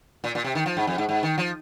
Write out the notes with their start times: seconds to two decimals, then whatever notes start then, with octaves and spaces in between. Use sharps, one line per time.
0.24 A#2
0.35 A#2
0.44 C3
0.55 D#3
0.66 F3
0.77 G#2
0.87 F2
0.98 G#2
1.09 G#2
1.23 D#3
1.38 F3